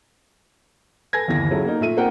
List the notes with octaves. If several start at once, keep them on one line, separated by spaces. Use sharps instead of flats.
A4 B4 G#5 G#6 A#6
G1 D#2 E3 A#6
C#3 F#3 E4 A4
A#3 D#4
A#2 A3 E5 D#7
A#3 C4 D#4 A#4 F#5 G5